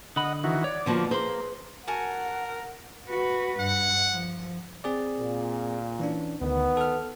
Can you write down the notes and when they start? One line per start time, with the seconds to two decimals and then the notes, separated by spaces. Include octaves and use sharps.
0.16 D3 D#5 F#5 B5
0.44 D#3 E3 F#4
0.64 C#5 D5
0.86 D3 F3 A#3 B3 F#4
1.11 A#3 G#4 B4 C5 C6
1.88 F#4 A#4 F#5 G#5 A5
3.08 F#4 B4
3.60 G2 F#5
4.12 F3
4.84 C4 G#4 D5
5.21 A#2
5.99 E3 C#4 D4
6.41 D2 D#3 B3
6.77 A4 F6